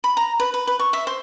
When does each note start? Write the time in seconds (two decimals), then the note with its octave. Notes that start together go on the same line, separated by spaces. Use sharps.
0.04 B5
0.17 A#5
0.40 B4
0.54 B4
0.67 B4
0.79 C#6
0.93 E5
1.07 C5